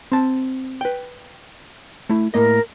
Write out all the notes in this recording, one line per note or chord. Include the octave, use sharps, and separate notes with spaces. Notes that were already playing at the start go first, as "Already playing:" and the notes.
C4 A5
B4 G5
A3 E4
A2 A#3 A#4 D#5